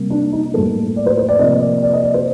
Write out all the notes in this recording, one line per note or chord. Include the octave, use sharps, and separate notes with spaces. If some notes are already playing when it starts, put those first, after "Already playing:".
Already playing: C3 G3 A#3
D4
D#4
A2 G3 A#3 A4
D5
C5
C5
D5
C3 F3 A#3 D#5
D5
D5
D#5
D5
C5